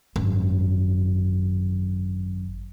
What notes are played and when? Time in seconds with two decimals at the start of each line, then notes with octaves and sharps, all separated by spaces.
0.16 G#1 F#2